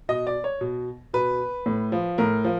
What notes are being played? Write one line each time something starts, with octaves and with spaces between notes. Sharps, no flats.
B2 D#5
D5
C#5
B2
B2 B4
A2
F3
A2 A#4
F3